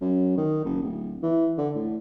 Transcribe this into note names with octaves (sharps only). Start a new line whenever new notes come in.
F#2
D#3
F#1
D1
E3
D3
A2